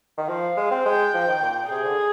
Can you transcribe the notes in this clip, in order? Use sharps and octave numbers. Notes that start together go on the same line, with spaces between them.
D#3
F3 F5
G#3
C4
G#3 G5
F3
D#3
A#2
C3 G#4
D3